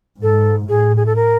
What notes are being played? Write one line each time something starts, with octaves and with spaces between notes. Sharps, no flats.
G#2 A4
A2 G#4
G#4
A4
A#4